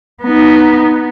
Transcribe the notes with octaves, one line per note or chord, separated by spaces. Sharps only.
B3 D#4